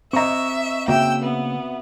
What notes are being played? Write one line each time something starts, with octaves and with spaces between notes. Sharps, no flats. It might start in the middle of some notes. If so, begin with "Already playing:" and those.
C4 D#5 E5 A#5 C#6
C#3 A#3 F#4 E5 G5 E6
B3